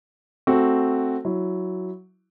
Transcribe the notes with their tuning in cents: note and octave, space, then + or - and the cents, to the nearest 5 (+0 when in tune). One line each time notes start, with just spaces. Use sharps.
A3 +0 C4 +0 F#4 +0
F#3 +0 E4 +0